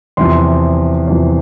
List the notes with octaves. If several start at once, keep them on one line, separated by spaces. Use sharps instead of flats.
E2 C3 F3 C6
E2 C3 F3